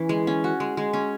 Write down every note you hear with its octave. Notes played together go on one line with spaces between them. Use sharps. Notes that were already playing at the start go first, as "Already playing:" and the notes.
Already playing: E3 C#4
G#3
C#4
F#4
G#3
G#3
C#4